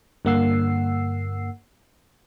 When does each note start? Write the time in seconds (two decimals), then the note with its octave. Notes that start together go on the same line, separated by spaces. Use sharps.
0.25 G2 D3 A#3 F#5 E6 C7